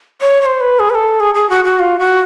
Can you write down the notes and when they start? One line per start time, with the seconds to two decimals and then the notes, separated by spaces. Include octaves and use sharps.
0.21 C#5
0.42 C#5
0.46 C5
0.61 B4
0.79 G#4
0.90 B4
0.95 A4
1.20 G#4
1.34 G#4
1.50 F#4
1.65 F#4
1.80 F4
1.99 F#4